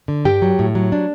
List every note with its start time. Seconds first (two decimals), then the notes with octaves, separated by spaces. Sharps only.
0.08 D3
0.25 G2 G4 G5
0.42 F#3
0.59 A2
0.75 F#3
0.92 D4